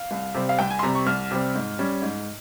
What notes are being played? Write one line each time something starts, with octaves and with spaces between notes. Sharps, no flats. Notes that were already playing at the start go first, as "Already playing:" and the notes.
Already playing: F5
C2
C3 G3 C4
F5
C2 G5
G#5
C6
C3 G3 C4 A#5
C#6
C2 F6
C3 G3 C4
G#2
G3 C#4
G#2